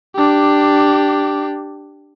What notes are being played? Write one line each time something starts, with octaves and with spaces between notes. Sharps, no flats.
D4 G4